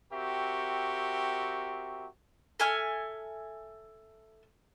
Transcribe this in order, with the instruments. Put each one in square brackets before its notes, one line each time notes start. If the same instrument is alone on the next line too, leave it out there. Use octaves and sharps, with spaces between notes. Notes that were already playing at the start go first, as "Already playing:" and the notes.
[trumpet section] C4 F#4 G4 A#4 E5 C#6
[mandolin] A4 E5 G#5 F6